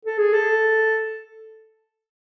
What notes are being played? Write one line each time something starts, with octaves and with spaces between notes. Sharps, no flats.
A4
G#4
A4